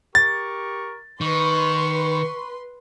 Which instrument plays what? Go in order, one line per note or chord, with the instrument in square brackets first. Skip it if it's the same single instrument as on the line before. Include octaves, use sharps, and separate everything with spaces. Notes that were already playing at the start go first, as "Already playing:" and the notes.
[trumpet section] G4 A#4 C#6 [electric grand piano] A6
[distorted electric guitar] D#3 [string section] B4 C6 [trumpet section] C#6